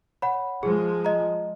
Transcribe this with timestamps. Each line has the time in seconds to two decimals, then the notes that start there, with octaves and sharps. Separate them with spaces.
0.22 C#5 F#5 B5
0.63 F3 G#3 G#4
1.05 D#5 A#5